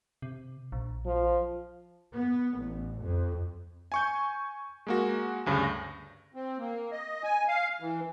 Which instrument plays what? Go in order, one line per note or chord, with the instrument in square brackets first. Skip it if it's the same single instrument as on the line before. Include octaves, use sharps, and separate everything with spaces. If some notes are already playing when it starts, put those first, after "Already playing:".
[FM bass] C3
A#1
[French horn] F3
[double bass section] B3
A1
F2
[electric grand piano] G#5 C#6 G6
G#3 A#3 F#4
D2 G2 C#3
A#6
[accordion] C4
A#3
D#5
G#5
F5
E3